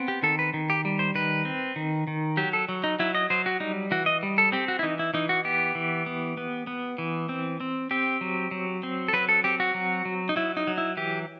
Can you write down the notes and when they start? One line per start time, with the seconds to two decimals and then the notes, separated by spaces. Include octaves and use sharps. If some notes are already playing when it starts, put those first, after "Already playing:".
Already playing: B3 C4
0.08 G4
0.23 D#3 A4
0.39 B4
0.54 D#3
0.70 G4
0.85 G3
0.99 C5
1.15 D#3 B4
1.45 C4
1.76 D#3
2.07 D#3
2.37 F#3 G4
2.53 A4
2.69 F#3
2.84 D#4
2.99 F#3 E4
3.15 D#5
3.30 F#3 C5
3.46 F#4
3.60 G3 D#4
3.91 E3 F#4
4.06 D#5
4.23 G3
4.38 A4
4.52 C4 G4
4.68 F#4
4.79 E4
4.83 E3 D#4
4.99 E4
5.14 E3 D#4
5.29 F#4
5.45 B3 G4
5.75 E3
6.06 B3
6.37 B3
6.67 B3
6.98 E3
7.29 C4
7.60 C4
7.91 C4 G4
8.21 F#3
8.51 F#3
8.83 C4
9.08 A4
9.13 F#3 B4
9.29 A4
9.44 C4 G4
9.60 F#4
9.74 F#3
10.05 F#3
10.29 D#4
10.36 F#3 E4
10.57 D#4
10.67 F#3
10.78 E4
10.97 E3 G4